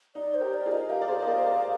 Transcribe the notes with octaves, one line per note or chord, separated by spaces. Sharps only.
D#4 D5
C5
G4 A#4
D5
F4 G#4
D#5
G4 A#4 F5
D5
G#4 C5
D#5
A#4 D5
C5
A#4 D5